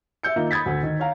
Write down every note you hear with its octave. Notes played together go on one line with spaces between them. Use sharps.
E5 E6 G6 C#7
D#3 A#3 D#4 F4
B5 D#6 G#6 A6 B6
D2
D#3
C#5 F5 A#5